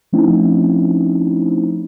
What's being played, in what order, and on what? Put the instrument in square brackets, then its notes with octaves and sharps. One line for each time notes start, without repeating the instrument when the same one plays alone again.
[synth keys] F3 A3 C4 C#4 D#4 E4